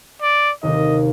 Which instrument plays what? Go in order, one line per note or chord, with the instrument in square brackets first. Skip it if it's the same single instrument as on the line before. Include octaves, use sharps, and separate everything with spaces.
[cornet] D5
[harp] D#2 C3 D#3 [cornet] D#5